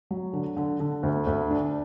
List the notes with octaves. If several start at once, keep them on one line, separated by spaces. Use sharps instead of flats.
F#3
D3
D3
D3
D2
D2
D4